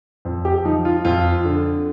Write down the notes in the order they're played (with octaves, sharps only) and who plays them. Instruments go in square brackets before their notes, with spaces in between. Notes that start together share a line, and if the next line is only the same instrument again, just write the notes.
[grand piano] F2
G4
F3 D#4
F4
F2 F4
D3